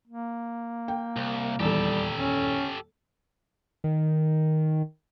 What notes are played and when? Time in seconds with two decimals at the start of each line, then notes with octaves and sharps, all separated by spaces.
0.07 A#3
0.88 G5
1.16 C2
1.60 D#1 E2 G3 G4 A4
2.18 C#4
3.84 D#3